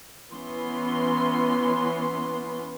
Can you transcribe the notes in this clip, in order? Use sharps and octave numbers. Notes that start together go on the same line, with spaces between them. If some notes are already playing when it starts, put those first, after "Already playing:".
E3 B3 C#4 C6